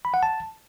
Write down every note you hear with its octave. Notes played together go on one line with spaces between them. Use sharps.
B5
F#5
A5